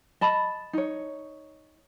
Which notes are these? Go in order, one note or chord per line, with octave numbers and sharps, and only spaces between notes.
D#5 A5 B5
D#4 C#5